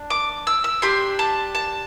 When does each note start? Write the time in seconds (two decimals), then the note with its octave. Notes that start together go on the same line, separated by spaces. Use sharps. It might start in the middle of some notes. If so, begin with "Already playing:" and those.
Already playing: D4
0.10 D6
0.47 E6
0.64 E6
0.82 D4 G4 C6
1.19 A5
1.55 A5